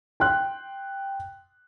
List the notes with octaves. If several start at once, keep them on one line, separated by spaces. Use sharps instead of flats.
G5 C6 F#6